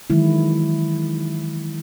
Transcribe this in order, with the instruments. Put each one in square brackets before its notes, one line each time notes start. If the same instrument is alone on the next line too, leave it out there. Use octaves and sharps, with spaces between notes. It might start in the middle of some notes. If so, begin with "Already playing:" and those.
[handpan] D#3 E3 F#3 G#3 E4